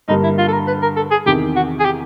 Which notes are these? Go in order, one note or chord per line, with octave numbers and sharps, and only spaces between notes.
G2 D3 G3 A#3 D#4
E4
F4
A4
A#4
B4
A#4
A4
G#4
E2 C3 D#3 G4
F#4
G#4
G4